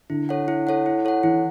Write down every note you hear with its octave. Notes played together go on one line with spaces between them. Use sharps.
D3 E4
A4 C#5 F#5
E4
A4 C#5 F#5
E4
A4 C#5 F#5
E3 E4